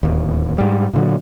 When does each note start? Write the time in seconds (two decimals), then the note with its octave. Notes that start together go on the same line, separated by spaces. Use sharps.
0.03 D1 D#2
0.58 G#2 G3
0.93 A#2 D3 F#3